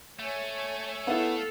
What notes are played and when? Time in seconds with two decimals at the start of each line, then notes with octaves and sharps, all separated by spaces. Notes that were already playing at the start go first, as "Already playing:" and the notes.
0.19 A3 C#5 G#5
1.07 B3 E4 A4 F5